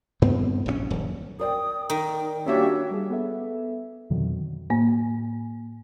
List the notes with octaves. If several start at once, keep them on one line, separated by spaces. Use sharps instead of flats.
G2 B3 C4
A#1 F3 C#4
D#1 F#2
A#4 D5 G5 D#6
D#3 D#4
G3 A#3 C#4 D4 F#4 C#5 E5
G3 G#4
B3 A4 E5
F2 B2 D3 D#3 F#3
A2 A#3